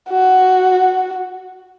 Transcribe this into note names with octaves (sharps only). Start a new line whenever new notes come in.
F#4